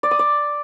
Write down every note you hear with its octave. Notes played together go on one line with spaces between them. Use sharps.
D5
D#6
D5